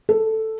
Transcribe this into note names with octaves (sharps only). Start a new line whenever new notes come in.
A4